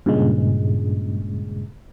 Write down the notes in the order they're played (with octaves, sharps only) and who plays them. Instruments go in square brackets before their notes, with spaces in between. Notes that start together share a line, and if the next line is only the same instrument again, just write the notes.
[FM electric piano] G2 A#2 C#3 G#3